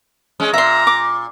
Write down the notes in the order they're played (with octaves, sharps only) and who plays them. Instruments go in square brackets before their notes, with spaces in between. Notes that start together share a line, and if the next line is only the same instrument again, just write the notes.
[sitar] G#3 C#4
[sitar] A#2 [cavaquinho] E5 C6 [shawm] A#5
[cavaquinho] D6